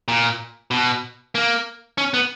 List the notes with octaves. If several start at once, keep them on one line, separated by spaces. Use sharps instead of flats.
A#2
B2
A#3
C#4
B3